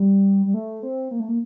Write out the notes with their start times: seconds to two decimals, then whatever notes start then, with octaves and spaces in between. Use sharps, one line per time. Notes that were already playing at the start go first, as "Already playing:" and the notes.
Already playing: G3
0.46 G3
0.54 A3
0.83 C4
1.11 A#3
1.20 A3
1.29 A#3